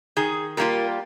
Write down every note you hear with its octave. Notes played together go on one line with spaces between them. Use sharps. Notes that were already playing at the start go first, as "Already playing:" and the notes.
D#3 G#4
G3 A#3 F4 A#4